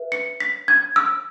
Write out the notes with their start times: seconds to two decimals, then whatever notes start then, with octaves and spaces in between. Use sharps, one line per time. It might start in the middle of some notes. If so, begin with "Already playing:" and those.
Already playing: B4 E5
0.12 C#7
0.40 B6
0.68 G#6
0.96 E6